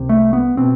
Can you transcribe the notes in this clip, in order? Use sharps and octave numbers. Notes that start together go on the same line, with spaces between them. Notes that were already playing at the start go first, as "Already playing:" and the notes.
Already playing: C2 C3
A3
B3
B2 C4